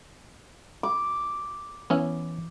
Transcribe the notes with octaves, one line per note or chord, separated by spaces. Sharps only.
D6
E3 B3 C#4 E4